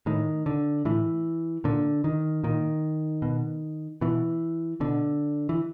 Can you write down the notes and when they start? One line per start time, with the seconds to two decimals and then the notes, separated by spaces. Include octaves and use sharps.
0.06 A2 D#3
0.46 D3
0.85 A2 E3
1.64 A#2 D3
2.04 D#3
2.43 A#2 D#3
3.22 B2
4.01 B2 E3
4.80 B2 D3
5.49 E3